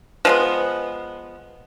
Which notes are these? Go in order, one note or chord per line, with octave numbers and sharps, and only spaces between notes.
F3 G#3 B3